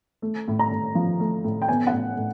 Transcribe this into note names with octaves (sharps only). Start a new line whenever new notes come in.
A3
A2
A#5
A2
F3
A3
A2
G5
B3 G#5
F#5
A2
A2